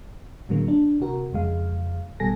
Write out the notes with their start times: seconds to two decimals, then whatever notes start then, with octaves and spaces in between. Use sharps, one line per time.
0.49 A2 D3 F#3 G#3 A#3
0.68 D4
1.01 C3 F#4 A#4
1.33 F2 C#3 G#3 F5
2.20 G#1 B2 G3 A4 G#5 A#6